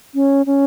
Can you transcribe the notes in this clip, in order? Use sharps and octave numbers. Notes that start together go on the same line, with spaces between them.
C#4
C#4